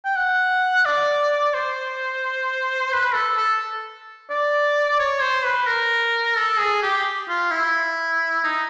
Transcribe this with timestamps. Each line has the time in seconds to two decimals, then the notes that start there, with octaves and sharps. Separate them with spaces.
0.05 G5
0.16 F#5
0.85 D5
1.54 C5
2.92 B4
3.14 A4
3.37 A4
4.30 D5
4.99 C#5
5.22 C5
5.44 B4
5.67 A#4
6.37 A4
6.59 G#4
6.83 G4
7.29 F4
7.51 E4
8.44 D#4